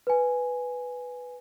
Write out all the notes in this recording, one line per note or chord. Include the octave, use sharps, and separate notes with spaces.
B4 G#5